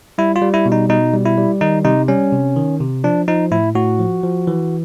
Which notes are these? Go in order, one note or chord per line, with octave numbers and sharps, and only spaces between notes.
G3 E4
F4
G3
E4
B2
D#4
B2 D#4
G3
E4
G3
D#3 D#4
C3 D#4
G3 C#4
C3
D#3
C3
F3 D4
F3 D#4
A2 E4
A2 F#4
F3
F3
E3